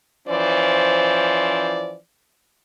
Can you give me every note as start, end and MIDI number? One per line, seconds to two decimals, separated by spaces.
0.27 1.97 52
0.27 1.97 53
0.27 1.97 61
0.27 1.97 72
0.27 1.97 74